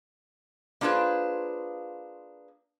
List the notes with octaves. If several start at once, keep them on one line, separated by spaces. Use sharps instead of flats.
A#3 D4 F4 G#4 B4 C5